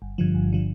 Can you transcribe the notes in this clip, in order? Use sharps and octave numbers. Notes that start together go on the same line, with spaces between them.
G1
G2 D3 F3
G1
D3 F3